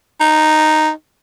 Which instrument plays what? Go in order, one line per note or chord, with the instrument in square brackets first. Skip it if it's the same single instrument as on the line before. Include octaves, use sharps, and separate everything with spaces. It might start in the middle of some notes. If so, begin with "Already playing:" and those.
[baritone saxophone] D#4